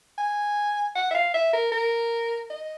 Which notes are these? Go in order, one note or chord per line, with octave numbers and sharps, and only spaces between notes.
G#5
F#5
E5
F5
E5
A#4
A#4
D#5